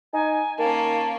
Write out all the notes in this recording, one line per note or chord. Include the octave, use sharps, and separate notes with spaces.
D#4 G#5
D#3 A#3 C#4 A5